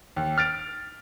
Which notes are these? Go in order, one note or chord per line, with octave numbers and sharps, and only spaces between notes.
D#2
F6 A6 D7